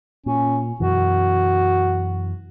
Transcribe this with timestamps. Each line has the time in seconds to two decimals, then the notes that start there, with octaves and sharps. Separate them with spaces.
0.26 A#2 C#4
0.80 F#2 B2 E3 F#4